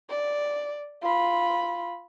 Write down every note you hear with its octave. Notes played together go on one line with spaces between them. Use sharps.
D5
F4 B5